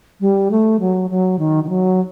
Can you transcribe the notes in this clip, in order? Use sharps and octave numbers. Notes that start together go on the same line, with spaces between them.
G3
A3
F#3
F#3
D#3
D#3
F#3